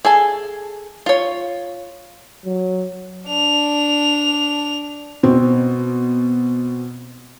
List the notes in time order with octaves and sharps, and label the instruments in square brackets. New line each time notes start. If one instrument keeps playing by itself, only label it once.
[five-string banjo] G#4 A4 G#5
F4 C#5
[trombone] F#3
[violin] D4 F7
[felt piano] B2 C4